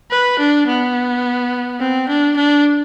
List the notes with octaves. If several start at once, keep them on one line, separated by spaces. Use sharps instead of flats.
B4
D4
B3
C4
D4
D4